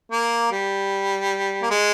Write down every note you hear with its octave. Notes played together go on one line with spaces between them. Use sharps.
A#3
G3
A#3
G#3